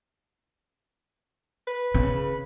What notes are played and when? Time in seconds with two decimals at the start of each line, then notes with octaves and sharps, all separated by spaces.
1.67 B4
1.94 C#3